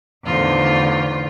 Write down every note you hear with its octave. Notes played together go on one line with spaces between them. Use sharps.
E2 A2 D3 D#3 F4 C5